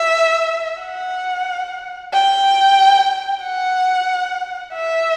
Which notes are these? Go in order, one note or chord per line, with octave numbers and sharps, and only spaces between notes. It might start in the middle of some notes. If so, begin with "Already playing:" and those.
Already playing: E5
F#5
G5
F#5
E5